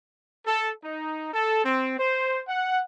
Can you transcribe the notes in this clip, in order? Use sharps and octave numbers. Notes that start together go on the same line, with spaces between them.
A4
D#4
A4
C4
C5
F#5